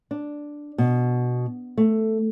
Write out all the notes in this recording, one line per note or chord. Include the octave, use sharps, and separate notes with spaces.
D4
B2
A3